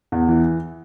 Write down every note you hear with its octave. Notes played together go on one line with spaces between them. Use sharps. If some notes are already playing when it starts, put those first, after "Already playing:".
E2
E3